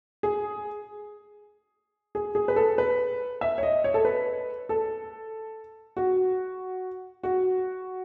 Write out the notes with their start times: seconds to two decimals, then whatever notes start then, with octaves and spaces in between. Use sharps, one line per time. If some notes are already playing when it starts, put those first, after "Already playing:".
0.23 G#4
2.15 G#4
2.35 G#4
2.48 B4
2.56 A4
2.78 B4
3.41 E5
3.58 C#5
3.63 D#5
3.84 C#5
3.94 A4
4.05 B4
4.69 A4
5.97 F#4
7.23 F#4